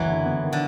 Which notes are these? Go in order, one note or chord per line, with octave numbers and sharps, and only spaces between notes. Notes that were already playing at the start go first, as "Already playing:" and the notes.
Already playing: F#1 E3 F#3
D3
B3
D#3
D3